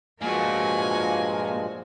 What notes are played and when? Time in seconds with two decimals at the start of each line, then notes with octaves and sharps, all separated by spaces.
0.22 G2 A#2 F3 G#3 A#3 F#4 G#5